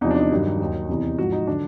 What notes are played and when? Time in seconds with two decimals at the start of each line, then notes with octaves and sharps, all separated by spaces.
0.01 E2 C3 F3 D#4
0.11 D4
0.18 D#4
0.30 G2 D#3 F#3
0.60 D#2 D#3 F#3
0.89 E2 C3 E3
1.18 G#2 F3 F#4
1.32 D#4
1.47 D3 F#3 D4